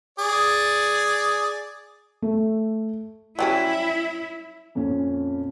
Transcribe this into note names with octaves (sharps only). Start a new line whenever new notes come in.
G#4 D5
A3
F#3 G3 C#4 E4
F2 A#2 C#4